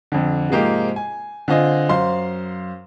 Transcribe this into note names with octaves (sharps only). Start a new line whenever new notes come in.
F2 D3
G#2 C3 F3 G#3 A#3 G4
G#5
D3 C4 F4 D#5 G#5
F#2 C5 F5 C6